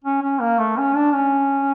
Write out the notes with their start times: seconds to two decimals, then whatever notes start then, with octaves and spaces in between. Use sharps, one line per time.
0.04 C#4
0.22 C#4
0.41 A#3
0.59 A3
0.77 C#4
0.95 D4
1.13 C#4